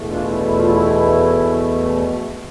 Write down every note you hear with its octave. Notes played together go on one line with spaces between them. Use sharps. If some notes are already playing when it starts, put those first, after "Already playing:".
Already playing: E2 B2 A3
D4 F4
E4
E4
F4
E4